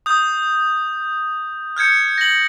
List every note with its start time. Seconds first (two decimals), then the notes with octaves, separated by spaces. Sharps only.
0.06 D#6 G6
1.77 F6 G6 G#6 C#7
2.18 A#6 F#7